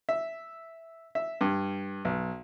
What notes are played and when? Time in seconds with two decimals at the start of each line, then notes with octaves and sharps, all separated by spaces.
0.09 E5
1.15 E5
1.41 G2
2.05 B1